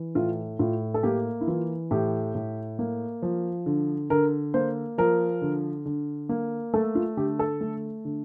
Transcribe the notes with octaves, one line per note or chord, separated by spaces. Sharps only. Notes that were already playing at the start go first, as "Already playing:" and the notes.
Already playing: E3
A2 F4
A2 F4
A4
A#3 G4
E4
E3 F4
A2 G4
A2
A#3
F3
D3
D3 A#4
A#3 C5
F3 A#4
D3
D3
A#3
A3 A4
F4
D3 G4
A4
A3
D3